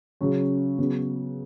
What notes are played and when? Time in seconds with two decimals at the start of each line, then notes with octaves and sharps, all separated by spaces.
0.21 C#3 F#3 C#4
0.79 C#3 F#3 B3